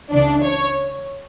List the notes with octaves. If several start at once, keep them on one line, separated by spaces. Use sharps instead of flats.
C#2 C#3 E3 D4
C#5